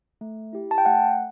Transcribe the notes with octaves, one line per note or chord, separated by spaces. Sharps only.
A3
E4 G4
A5
G5
A3 F#5